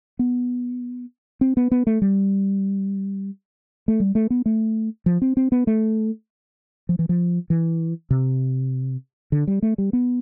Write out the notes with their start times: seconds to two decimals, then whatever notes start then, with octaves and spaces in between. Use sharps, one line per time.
0.19 B3
1.41 C4
1.57 B3
1.71 B3
1.87 A3
2.02 G3
3.88 A3
4.00 G3
4.15 A3
4.30 B3
4.46 A3
5.06 F3
5.22 C4
5.37 C4
5.52 B3
5.67 A3
6.89 F3
6.99 E3
7.09 F3
7.50 E3
8.11 C3
9.32 D3
9.47 G3
9.62 A3
9.78 G3
9.93 B3